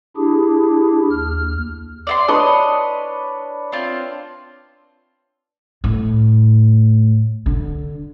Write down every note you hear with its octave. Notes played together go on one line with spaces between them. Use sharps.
D4 E4 G4 G#4
D#2 F6
D5 E5 C6
D4 B4 C#5 D#5
C4 F4
A2
D3